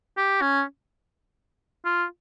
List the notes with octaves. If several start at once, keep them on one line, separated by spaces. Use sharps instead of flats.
G4
C#4
F4